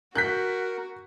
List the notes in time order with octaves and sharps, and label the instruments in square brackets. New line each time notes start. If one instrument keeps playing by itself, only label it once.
[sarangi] F#4 [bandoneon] A#4 [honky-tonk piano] F#6 G6 B6